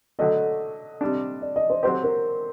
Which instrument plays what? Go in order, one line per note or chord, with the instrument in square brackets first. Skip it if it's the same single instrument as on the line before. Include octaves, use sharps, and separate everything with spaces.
[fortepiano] D3 F#3 A3 [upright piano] D#5
[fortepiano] C3 G3 D4
[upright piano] D5
D#5
C5
[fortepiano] F#3 C4 G4 [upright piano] C5
[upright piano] A#4